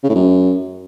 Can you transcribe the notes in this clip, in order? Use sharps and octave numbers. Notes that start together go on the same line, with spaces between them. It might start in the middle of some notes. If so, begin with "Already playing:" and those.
C#3
A2
F#2